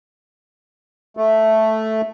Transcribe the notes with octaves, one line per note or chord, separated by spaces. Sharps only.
A3